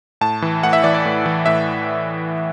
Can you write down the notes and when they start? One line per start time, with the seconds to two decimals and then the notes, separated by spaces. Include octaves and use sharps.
0.21 A2 A5
0.42 E3
0.63 A2 F#5
0.73 E5
0.83 E3 D5
0.94 D5
1.05 A2
1.26 E3
1.46 A2 E5